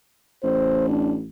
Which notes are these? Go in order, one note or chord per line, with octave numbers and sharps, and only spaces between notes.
A1 C5
D4